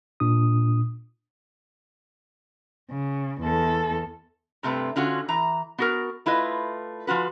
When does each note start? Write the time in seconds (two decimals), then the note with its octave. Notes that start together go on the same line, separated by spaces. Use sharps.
0.20 A#2 D4 D#6
2.90 C#3
3.42 E2 A4
4.63 G2 C3 A3 C4 B4
4.96 D3 C#4 F4 F#4
5.29 E3 A#5
5.78 B3 F#4 A#4
6.26 A3 E4 F4 B4 D#5
7.07 F3 F4 F#4 B4